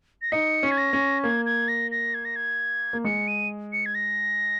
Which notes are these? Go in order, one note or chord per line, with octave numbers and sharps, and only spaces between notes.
A#6
D#4 C#7
C#4
G#6
A#6
C#4
A#3 G#6
G#6
A#6
A#6
G#6
A#6
G#6
A#3
G#3 C#7
D#7
C#7
G#6
A#6